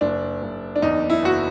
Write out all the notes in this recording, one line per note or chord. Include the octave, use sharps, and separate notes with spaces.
F#1 D4
F#1
D4
E2 D#4
E4
F#1 F#4